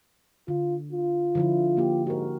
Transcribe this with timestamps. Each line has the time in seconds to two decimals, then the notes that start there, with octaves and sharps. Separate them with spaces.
0.48 D3 F4
0.92 F4
1.35 D3 F3 E4
1.77 A#3 G4
2.07 G#2 F#4 A#4